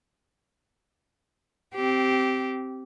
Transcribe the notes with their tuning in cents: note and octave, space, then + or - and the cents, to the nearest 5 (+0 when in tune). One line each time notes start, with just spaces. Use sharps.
C4 +0 G4 -15